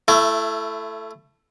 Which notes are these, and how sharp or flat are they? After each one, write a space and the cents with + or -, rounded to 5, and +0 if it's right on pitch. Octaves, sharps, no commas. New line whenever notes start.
A3 +0 E4 +30